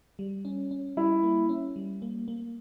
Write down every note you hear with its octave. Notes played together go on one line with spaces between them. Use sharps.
G3
C#4
C#4
G3 E4
A#3
C#4
G3
A#3
A#3